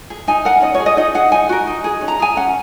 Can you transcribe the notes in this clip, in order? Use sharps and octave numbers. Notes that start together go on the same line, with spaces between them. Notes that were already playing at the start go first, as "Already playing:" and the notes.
G#4
D#4 G#5
A#4 F#5
C#4 D#5
C#5
G#4
D#5
D#4 D#5
G#4 F#5
D#4 G#5
F#4 A#4
D#4
G#4
C#4
A#5
G#4 G#5
C#4 F#5